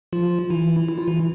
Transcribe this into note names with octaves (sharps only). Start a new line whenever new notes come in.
F3 F4
E3 E4
E4
F4
E3 E4